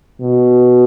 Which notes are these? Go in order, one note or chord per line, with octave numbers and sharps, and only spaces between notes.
B2